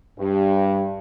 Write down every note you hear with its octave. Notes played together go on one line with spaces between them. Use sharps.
G2